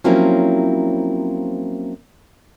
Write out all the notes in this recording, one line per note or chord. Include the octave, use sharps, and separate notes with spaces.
F3 F#3 A#3 C4 C#4 E4